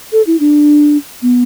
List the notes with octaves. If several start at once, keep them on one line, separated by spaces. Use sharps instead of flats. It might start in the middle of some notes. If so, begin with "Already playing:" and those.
A4
E4
D4
B3